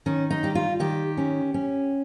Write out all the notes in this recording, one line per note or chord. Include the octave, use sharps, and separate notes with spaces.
D#3 C#4
D#4
G3 G4
F4
D#3 G4
C#4
C#4